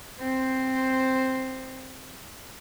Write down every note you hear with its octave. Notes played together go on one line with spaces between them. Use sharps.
C4 C5